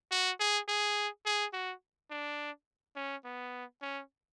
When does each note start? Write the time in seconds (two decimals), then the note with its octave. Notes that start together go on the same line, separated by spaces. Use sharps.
0.11 F#4
0.40 G#4
0.68 G#4
1.26 G#4
1.53 F#4
2.11 D4
2.96 C#4
3.25 B3
3.82 C#4